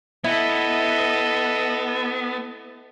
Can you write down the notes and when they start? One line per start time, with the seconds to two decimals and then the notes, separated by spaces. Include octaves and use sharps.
0.24 B3 E4 A4 D#5